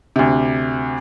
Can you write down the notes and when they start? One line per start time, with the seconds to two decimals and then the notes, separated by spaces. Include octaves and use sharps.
0.16 D2 C3